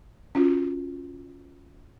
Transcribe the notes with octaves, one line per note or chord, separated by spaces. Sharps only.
C#4 F4 F#4